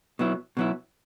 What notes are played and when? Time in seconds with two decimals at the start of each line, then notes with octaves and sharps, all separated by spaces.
0.19 B2 F#3 B3 E4
0.57 B2 F#3 B3 E4